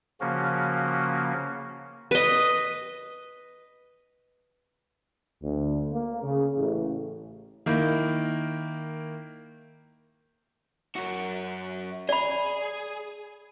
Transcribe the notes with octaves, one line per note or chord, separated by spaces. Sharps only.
C#3 F3 A#3 C#4 F#4
B4 D#5
D2
A#3
C#3
A1
D#3 A#3 E4
F#2 F#4
G#4 D5 B5